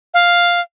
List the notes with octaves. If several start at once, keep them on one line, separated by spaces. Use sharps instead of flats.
F5